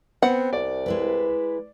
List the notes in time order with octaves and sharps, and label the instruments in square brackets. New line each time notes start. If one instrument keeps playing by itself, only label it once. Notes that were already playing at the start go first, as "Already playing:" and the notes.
[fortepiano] B3 [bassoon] C4 [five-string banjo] F#5
[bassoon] C2 [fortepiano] D5
[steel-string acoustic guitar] G#3 E4 B4